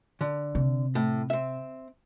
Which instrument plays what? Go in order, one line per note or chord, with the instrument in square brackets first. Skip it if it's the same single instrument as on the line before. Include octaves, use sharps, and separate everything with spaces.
[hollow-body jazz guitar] D3
[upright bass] C3
[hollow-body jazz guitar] A2
C4 E5